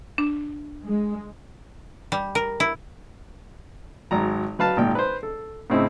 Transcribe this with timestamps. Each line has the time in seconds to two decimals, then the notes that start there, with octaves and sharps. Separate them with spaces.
0.18 D4
0.84 G#3
2.12 G3
2.35 A#4
2.60 E4
4.11 G#1 F#3 A#5
4.59 F#3 B4 F5 A5
4.77 G#1 A#2 G5
4.95 B4 C5
5.23 A4
5.70 A2 C#3 C4 D#4 E4